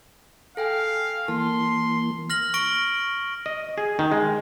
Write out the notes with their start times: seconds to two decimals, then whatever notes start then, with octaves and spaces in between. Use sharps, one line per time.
0.57 A4 F5 G5 G#5
1.28 E3 A#3 A5 C6
2.30 F6 A#6 F#7
2.54 C#6 A#6 D7 G7
3.46 D#5
3.78 G#4
3.99 D#3
4.12 G#3